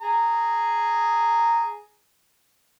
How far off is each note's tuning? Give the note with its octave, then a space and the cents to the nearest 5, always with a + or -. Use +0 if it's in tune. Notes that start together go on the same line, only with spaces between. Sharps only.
G#4 +0 A#5 -10